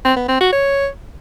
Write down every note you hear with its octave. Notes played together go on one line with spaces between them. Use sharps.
C4
B3
C4
F#4
C#5